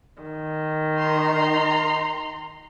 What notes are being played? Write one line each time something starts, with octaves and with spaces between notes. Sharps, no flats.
D#3
A#5 C6